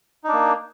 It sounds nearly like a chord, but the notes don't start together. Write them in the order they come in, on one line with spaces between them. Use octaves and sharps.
D#4 D4 A#3